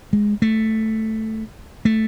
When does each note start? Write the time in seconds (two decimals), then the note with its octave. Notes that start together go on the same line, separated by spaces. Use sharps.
0.13 G#3
0.42 A3
1.85 A3